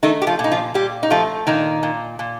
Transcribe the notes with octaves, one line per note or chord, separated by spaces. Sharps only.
D#3 A3 D#4
G4
F3 F4
A#2
D#4
F3 F4
A#2 G3 G4
D#4
F3 A3 F4
A#2 D#3 D#4
A#2
A#2